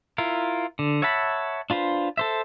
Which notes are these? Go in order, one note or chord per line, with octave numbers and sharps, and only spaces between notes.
E4 F4 A#4
D3
C#5 E5 F#5 A5 B5
D4 F4 B4 C5
A4 C5 E5